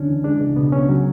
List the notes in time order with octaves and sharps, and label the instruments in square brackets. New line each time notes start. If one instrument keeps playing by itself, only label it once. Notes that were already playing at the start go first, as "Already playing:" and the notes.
Already playing: [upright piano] D2 [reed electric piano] C#4 D4
[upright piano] E3
[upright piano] G#3 [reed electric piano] D4
[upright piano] C#2
[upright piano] B2 [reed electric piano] B3
[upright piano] C#2 [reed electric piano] C#4
[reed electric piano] F#3